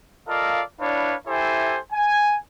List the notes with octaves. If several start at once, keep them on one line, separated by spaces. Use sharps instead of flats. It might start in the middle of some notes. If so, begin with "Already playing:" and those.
F4 A4 A#4 D5 D#5 F5
D4 E4 B4 C#5 D5 F5
E4 G4 A4 C5 E5 G#5
G#5